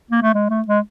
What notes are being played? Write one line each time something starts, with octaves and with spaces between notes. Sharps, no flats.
A#3
A3
G#3
A3
G#3